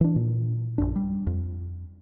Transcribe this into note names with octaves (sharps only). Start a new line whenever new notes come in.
E3 D4
A#2
A#1 F#2 D4
G3
F2